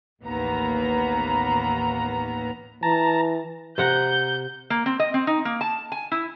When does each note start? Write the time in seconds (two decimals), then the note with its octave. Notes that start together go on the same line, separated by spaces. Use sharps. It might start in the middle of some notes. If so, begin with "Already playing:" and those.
0.22 A1 D#2 A#3 B3 A#5
2.83 E3 A5 A#5
3.78 C3 F#5 A#5 G6
4.70 A#3
4.86 C4
5.00 D#5
5.14 C4
5.27 D#4
5.45 A#3
5.61 A5
5.92 G#5
6.12 E4